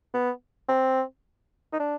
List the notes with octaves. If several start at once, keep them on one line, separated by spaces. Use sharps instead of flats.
B3
C4
D#4
D4